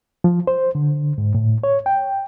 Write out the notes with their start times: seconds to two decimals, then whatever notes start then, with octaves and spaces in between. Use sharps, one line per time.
0.24 F3
0.47 C5
0.75 D3
1.18 G#2
1.35 A2
1.64 C#5
1.86 G5